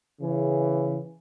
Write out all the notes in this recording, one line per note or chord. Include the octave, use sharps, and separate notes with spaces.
C#3 E3